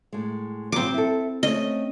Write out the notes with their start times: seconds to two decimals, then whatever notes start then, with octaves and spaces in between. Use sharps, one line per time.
0.13 A2 G#3
0.72 G#2 F3 F#3 C4 D6
0.94 E4 A4
1.43 A3 C4 C#4 D#5